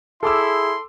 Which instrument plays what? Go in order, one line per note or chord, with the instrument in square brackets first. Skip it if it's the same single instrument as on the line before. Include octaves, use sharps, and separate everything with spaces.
[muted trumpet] E4 [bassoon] G#4 [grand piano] A4 D6 E6 [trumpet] C6